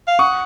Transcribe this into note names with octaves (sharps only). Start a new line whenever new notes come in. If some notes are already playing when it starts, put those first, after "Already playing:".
F5
F#5 C#6 D#6